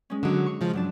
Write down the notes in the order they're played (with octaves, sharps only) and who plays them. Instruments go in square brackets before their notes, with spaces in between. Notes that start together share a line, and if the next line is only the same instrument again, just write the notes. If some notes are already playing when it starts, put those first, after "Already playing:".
[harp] G#3 C#4
[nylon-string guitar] D3 F#3 [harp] D#5 D6 E6
[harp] C#6
[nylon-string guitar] C#3 F3 G#3
[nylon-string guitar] G2 [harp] F#3 D4 A5